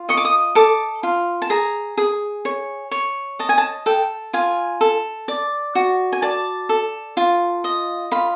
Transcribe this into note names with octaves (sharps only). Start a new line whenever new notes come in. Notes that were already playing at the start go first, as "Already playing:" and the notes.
Already playing: F4
D#5 C#6
D6
D#6
A4 D6
F4
A5
G#4 A#5
G#4
C#5
C#5
D#5 A5
G#5
A5
A4 G5
F4 G#5
A4
D5
F#4
G#5
D5 A5
A4
F4
D#5
F4 B5